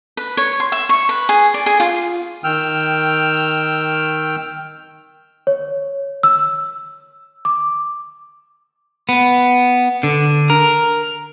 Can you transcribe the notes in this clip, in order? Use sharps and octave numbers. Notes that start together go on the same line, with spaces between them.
B4
C#5
C6
E5
C#6
B4
G#4
D5
G#4
F4
D#3 G5 E6 F6
C#5
E6
D6
B3
D3
A#4